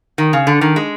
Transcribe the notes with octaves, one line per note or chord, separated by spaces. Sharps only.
D#3
C#3
D3
D#3
G#3